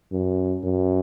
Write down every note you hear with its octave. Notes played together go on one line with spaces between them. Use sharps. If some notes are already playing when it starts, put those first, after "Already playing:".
F#2
F#2